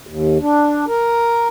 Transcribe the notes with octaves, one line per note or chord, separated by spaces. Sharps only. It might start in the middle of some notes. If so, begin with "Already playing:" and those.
D#2
D4
A#4